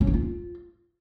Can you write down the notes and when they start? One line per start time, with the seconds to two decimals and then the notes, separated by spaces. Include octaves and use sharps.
0.01 C#4
0.07 E3
0.14 F4